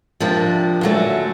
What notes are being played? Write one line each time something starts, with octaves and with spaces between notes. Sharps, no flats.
C3 F3 A#3 D4
D3 F#3 A3 C#4